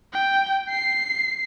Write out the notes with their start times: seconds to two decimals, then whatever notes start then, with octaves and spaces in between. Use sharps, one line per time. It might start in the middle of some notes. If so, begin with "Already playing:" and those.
0.13 G5
0.70 C7